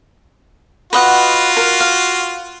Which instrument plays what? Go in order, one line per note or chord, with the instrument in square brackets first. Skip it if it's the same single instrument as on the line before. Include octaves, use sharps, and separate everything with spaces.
[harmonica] F4 F#4 [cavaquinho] B4 D#5 F#5
[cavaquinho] A#4
F5